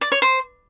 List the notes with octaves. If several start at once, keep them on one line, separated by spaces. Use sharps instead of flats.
D5
C#5
C5